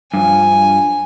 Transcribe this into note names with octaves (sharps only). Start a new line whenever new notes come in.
G2 F3 G#5